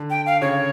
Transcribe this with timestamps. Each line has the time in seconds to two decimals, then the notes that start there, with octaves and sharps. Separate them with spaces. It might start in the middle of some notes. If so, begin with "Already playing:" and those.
Already playing: D3
0.10 G5
0.26 F5
0.41 C#3 C#5